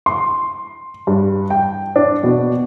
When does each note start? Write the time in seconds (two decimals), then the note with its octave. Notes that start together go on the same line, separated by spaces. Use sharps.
0.06 C6
1.07 G2
1.50 G5
1.96 D4
2.23 B2